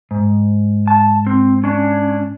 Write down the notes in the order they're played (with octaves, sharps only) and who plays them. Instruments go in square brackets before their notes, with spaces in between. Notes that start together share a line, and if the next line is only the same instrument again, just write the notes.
[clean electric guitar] G#2
[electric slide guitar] A5
C4
C#4 D4